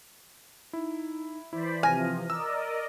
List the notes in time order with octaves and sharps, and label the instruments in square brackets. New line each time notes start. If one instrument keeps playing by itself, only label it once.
[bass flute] D#4 [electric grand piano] E4
[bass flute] E3 [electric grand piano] E4 [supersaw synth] C5 D5 B5
[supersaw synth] C3 F3 [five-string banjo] G#5 [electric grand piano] F6 A#6 D#7
[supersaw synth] A#4 D5 D#5 [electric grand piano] E6